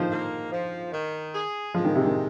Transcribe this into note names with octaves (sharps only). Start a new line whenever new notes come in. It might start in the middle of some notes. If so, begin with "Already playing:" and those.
Already playing: D#3 F3 C5
A#3
F3
D#3
G#4
F3 G#3
D#3
C3
D#3